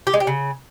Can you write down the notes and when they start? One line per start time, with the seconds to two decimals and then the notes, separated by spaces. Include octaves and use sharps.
0.07 G4
0.14 G#3
0.20 G4
0.27 C#3